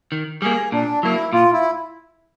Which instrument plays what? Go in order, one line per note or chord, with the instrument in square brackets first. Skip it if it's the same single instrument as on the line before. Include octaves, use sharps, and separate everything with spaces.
[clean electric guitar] D#3
[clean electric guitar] G3 A#3 [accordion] G#4
[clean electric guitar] A#2 [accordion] D4
[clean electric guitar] F#3 A#3 [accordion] E4
[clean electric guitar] A#2 [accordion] F4
[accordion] E4